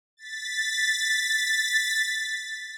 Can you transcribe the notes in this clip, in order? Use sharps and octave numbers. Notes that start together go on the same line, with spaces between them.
A6 B6